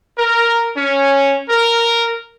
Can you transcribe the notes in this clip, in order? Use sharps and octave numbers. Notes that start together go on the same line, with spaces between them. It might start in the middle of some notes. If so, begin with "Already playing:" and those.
A#4
C#4
A#4